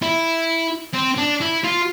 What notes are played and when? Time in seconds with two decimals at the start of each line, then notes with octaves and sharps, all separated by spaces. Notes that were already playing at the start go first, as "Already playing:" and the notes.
0.02 E4
0.94 C4
1.18 D4
1.41 E4
1.64 F4